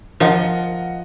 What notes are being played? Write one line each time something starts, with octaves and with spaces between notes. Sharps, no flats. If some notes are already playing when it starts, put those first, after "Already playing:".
F3 A#4 D#5 F#5